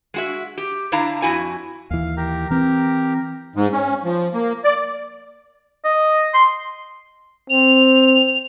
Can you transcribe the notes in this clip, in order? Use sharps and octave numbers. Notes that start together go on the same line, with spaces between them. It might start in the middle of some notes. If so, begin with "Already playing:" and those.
G#3 F#4 E5
G4
D3 D4 E4 F5 A5 A#5
F2 E4 F#4 G#5
D#2 E3 F5
G4 A#4
E3 C4 G4 A#4
G#2
C#4
F3
A#3
D5
D#5
C6
C4 F7